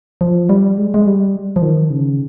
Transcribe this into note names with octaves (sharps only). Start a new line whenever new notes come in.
F3
G3
G#3
G#3
G3
F3
D#3
C#3